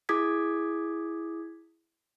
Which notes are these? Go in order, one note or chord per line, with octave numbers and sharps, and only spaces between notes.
E4 G#4 D6 D#6 G#6 B6